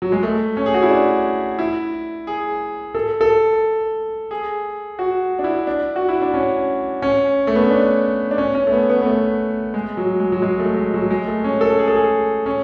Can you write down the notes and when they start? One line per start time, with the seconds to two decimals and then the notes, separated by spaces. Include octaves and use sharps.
0.02 F#3
0.12 G#3
0.23 A3
0.57 C#4
0.66 G#4
0.74 F#4
0.82 E4
0.91 D4
1.59 E4
2.27 G#4
2.95 A4
3.21 A4
4.31 G#4
4.99 F#4
5.39 D4
5.44 E4
5.67 D4
5.96 F#4
6.09 E4
6.22 D4
6.34 C#4
7.02 C#4
7.47 A3
7.55 B3
7.63 C#4
7.70 D4
8.31 D4
8.38 C#4
8.55 C#4
8.67 A3
8.72 B3
8.90 B3
9.02 B3
9.06 A3
9.74 G#3
9.97 F#3
10.20 G#3
10.32 F#3
10.42 G#3
10.60 A3
10.76 G#3
10.94 F#3
11.10 G#3
11.27 A3
11.44 C#4
11.61 A4
11.79 G#4
11.88 A4
11.96 G#4
12.46 C#4